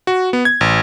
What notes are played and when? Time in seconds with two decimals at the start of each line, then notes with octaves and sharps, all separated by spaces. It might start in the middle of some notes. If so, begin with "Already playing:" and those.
0.07 F#4
0.33 B3
0.45 G#6
0.61 A1